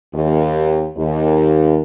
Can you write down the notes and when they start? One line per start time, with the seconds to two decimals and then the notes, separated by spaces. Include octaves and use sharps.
0.14 D#2
0.97 D#2